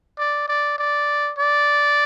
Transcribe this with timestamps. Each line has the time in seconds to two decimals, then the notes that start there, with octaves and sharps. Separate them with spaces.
0.19 D5
0.48 D5
0.78 D5
1.39 D5